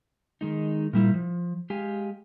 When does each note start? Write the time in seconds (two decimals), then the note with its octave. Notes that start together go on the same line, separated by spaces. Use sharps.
0.41 D#3 G#3 D#4
0.93 A#2 G3 E4
1.14 F3
1.70 G#3 G4 F5 G5 G#5